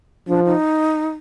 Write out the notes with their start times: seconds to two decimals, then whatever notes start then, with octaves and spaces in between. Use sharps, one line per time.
0.27 F3 D4
0.45 D#4